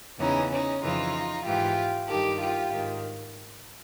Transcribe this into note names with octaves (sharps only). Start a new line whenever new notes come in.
E2 C#3 E3 C#4 D#4
C#4 D#4
F2 C#3 E3 D#4 F4
G#2 E3 F4 G4
G2 D#3 G4 A4
F4 G4
G#2 D#3